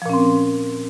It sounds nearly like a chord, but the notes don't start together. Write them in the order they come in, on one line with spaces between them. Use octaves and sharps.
F3 A#2 C#4 C4